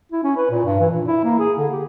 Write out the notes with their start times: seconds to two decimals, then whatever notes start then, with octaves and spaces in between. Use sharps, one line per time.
0.12 E4
0.24 C#4
0.37 B4
0.50 A#2
0.65 G2
0.80 E3
0.91 A#2
1.07 E4
1.24 A#3
1.39 G#4
1.58 D3
1.71 G4